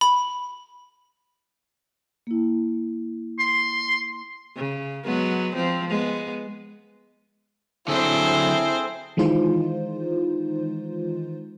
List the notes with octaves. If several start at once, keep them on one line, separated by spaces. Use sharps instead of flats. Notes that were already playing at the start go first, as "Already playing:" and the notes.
B5
A#3 E4
C6
C#3
F#3 G#3 B3
F3 C4
G#3 B3
D3 F#3 C4 E4 G#4 A4 C5
D#3 E3 G#3 D#4 F4 C5